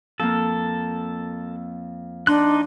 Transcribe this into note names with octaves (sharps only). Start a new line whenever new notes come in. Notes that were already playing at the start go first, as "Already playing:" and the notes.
F2 A#3 A4
D4 D#4 C6 F#6